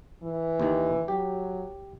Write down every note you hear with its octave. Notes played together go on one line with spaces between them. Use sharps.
E3
D#2 D#3
F#3 G4